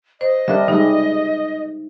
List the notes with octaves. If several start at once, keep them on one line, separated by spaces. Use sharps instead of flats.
C5 D#5
G3 D4 A#4 E5
G3 G#3 D#4